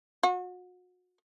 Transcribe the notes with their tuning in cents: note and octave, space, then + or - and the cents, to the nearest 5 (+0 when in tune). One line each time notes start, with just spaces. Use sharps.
F#4 -35